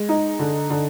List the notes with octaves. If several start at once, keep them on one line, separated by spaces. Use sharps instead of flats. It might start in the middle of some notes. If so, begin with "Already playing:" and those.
Already playing: G#3
D#4
D3
D3